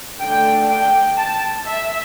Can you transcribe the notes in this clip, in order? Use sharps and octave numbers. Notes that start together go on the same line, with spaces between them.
D3 A3 D4 G5
G5
A5
E5